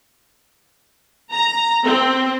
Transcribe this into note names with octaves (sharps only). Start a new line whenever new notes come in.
A#5
C4